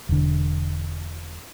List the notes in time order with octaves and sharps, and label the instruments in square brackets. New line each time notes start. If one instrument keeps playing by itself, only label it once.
[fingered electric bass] E1 D3